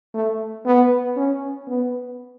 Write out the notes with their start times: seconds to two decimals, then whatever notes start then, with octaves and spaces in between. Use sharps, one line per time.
0.14 A3
0.66 B3
1.16 C#4
1.67 B3